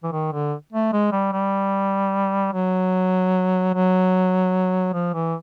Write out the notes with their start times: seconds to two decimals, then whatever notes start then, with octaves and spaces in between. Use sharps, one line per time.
0.03 E3
0.12 D#3
0.32 D3
0.73 A3
0.93 G#3
1.12 G3
1.32 G3
2.53 F#3
3.73 F#3
4.93 F3
5.14 E3